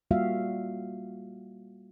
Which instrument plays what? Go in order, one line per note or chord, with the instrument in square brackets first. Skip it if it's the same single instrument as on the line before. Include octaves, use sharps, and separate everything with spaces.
[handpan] G3 A#3 F4 F#4 E5 F5